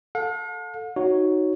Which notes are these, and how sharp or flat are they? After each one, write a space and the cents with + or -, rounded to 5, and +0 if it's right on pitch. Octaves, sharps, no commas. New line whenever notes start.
A4 +0 F5 +45
D#4 +0 F#4 +0 C#5 +0